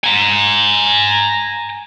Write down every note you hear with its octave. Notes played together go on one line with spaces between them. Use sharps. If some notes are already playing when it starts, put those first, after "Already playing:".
G#5 A#5